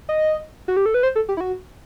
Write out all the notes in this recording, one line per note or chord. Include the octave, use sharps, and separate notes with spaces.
D#5
F#4
G4
A4
B4
C5
A4
G4
E4
F#4